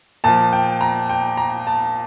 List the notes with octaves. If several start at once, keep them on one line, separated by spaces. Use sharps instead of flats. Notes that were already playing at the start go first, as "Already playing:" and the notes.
A#2 F3 A5
G5
A#5
G5
A#5
A5